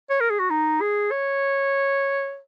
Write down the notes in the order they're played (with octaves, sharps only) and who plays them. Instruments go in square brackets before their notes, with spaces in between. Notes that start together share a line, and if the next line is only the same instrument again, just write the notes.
[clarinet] C#5
A#4
G#4
F#4
D#4
G#4
C#5